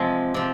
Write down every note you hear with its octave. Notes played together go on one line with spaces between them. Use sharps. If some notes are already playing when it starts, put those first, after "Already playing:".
Already playing: C3 F3 G#3
C3 F3